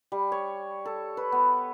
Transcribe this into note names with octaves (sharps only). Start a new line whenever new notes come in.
G3
C#5
A4
B4
B3